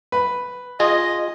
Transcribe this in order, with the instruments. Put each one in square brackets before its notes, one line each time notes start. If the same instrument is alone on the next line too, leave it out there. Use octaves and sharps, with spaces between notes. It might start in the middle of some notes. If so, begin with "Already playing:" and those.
[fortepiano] B4
[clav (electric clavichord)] F4 G#4 [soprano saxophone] D#5